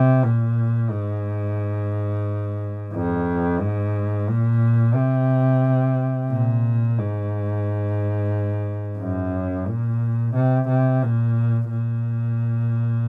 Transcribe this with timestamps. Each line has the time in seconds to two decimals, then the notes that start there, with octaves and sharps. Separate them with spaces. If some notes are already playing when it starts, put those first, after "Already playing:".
Already playing: C3
0.23 A#2
0.90 G#2
2.94 F2
3.60 G#2
4.28 A#2
4.95 C3
6.30 A#2
6.98 G#2
8.99 F#2
9.68 A#2
10.35 C3
10.68 C3
11.03 A#2
11.70 A#2